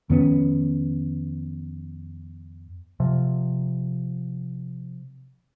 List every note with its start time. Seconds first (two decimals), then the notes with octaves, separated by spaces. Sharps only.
0.10 F2 D#3 B3 C#4
3.00 C3 F3